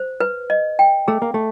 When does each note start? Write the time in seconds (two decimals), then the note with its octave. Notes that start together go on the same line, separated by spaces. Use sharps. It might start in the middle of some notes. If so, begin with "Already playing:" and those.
Already playing: C5
0.20 B4
0.50 D#5
0.79 G5
1.08 A3 G#4
1.22 A#3
1.34 A3